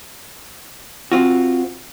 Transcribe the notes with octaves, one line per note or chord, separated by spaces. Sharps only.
C4 F4 F#4